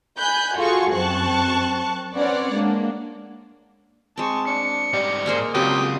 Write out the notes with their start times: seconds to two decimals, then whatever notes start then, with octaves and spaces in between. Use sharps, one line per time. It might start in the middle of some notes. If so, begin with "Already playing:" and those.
0.18 G#5 B5 F#6 G6
0.57 F4 F#4 G#4 A4 F5 C#6
0.93 F#2 C4 A5 C#6 F#6
2.16 C4 C#4 B4 C#5 D5 F#5
2.54 G#3 A#3 D4
4.17 G#3 C4 A5 C#6
4.47 D4 C#7
4.93 G#2 G3 D5
5.26 A#3 G#4 A#4 C5
5.55 C#2 F#3 C4 F4 G4 D#6